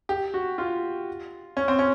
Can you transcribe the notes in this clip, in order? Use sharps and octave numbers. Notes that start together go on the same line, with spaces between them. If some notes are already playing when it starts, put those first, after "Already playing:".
G4
F#4
F4
C#4
C4
C#4